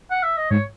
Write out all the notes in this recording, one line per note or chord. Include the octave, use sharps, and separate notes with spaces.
F#5
E5
D#5
G#2 C#5